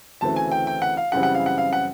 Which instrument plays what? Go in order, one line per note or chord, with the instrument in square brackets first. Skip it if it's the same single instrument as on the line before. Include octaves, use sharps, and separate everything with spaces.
[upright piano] D2 C#3 E3 A3 C4 A5
G#5
G5
G5
F#5
F5
F#2 C#3 E3 G3 C4 F#5
F#5
F5
F#5
F5
F#5